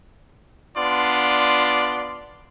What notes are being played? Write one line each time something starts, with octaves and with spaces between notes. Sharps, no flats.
B3 D4 F4 D5 C6